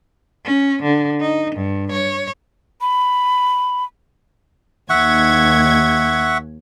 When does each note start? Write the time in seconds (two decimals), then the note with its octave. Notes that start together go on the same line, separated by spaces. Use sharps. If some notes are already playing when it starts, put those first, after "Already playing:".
0.45 C#4
0.83 D3
1.21 D#4
1.55 G2
1.92 C#5
2.81 B5
4.90 D#2 E5 F#5 C#6 G#6